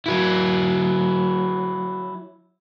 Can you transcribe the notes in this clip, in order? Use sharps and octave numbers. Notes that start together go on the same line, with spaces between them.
F#3 E4